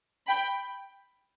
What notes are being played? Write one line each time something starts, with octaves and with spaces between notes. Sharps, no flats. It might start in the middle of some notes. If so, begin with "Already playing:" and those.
G5 B5